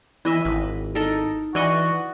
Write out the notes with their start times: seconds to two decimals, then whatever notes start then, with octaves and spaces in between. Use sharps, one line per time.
0.25 E3 E4 D#5 E5
0.45 G#1 B4
0.95 D#4 A4 A#4
1.55 E3 F#4 D5 D#5 C#6